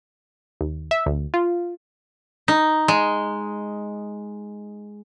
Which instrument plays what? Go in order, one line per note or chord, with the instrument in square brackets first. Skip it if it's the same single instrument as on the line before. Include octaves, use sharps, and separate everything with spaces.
[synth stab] D#2
E5
D2
F4
[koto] D#4
G#3